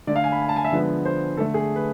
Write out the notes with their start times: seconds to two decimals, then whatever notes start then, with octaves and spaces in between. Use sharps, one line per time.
0.07 D3 A3 D5
0.16 F5
0.24 G#5
0.32 B5
0.42 G#5
0.49 A5
0.56 G#5
0.65 E5
0.72 D3 F3 G#3 B3
1.05 C5
1.37 D3 A3 A4
1.54 G#4
1.76 B4